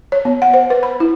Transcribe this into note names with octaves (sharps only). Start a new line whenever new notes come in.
C#5
B3
F#5
C5
B4
B5
E4